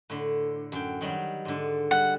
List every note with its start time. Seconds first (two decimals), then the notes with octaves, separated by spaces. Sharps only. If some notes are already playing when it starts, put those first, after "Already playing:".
0.10 A2 D3
0.72 F#2 G5
1.01 D#3 F#3 G3
1.45 G#2 D3
1.91 G3 F#5